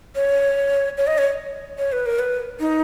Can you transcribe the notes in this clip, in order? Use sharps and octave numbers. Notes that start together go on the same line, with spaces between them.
C#5
C#5
D#5
C#5
C#5
B4
A#4
B4
D#4